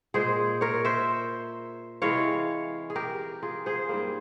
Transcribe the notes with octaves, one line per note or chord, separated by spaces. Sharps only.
A#2 G#3 G#4 C5
A#4 C#5
C5 E5
C3 E3 G#3 C#5 F5
G#4
G4 A#4
F4 G#4
G#4 C5
G#2 G3 A#3